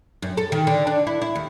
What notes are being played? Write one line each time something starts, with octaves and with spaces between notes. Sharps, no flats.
F#2
A4
D#3
D3
D4
E4
E4
D#2